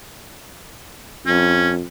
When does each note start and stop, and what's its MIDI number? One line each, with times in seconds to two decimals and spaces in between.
1.27 1.85 41
1.27 1.71 61